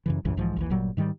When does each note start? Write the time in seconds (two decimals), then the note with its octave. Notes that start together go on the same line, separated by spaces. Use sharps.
0.06 F#2 C#3 E3
0.25 C2 F#2 A2 E3
0.37 B1 G#2 E3 F3
0.56 A1 D#2 E3
0.70 G1 A#2 F#3 G3
0.97 G#2 D#3 F3 G3